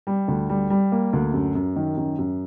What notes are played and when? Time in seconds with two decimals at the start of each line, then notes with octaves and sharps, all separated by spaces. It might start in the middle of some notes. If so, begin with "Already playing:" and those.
0.07 G3
0.28 D2
0.49 G3
0.70 G3
0.92 A#3
1.13 D2
1.33 F#2
1.55 F#2
1.76 D#3
1.97 F#2
2.19 F#2